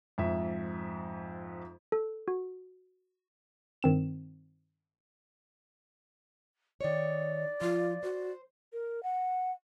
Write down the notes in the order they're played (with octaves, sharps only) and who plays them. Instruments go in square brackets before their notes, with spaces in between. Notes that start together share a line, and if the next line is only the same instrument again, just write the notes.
[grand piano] F2 G#2 E5
[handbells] A4
F#4
[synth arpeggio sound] G2 D#3 C4 E7
[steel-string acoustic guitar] D#3 C#5 [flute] D5
[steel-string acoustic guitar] F3 [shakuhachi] F4
[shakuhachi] F#4 [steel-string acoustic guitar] C5
[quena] A#4
F#5